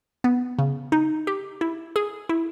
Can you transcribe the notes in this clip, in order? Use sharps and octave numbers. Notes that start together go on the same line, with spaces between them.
B3
C#3
D#4
G4
E4
G#4
E4